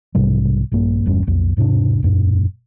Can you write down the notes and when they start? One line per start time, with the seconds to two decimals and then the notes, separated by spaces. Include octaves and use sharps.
0.15 B1 G#2 C3 G3
0.72 A#1 G2 A#3
1.06 G1 E2 G2 C#4
1.27 B1 F2
1.57 E1 G#2 C3 D4
2.02 E1 F#2 A#2